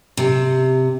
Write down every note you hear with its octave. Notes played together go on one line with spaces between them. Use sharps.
C3